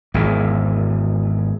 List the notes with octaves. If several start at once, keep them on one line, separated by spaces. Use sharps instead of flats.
G#1 E2